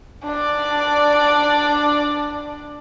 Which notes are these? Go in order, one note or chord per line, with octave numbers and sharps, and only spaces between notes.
D4 D5